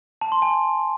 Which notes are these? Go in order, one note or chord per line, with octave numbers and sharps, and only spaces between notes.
A5
C6
G#5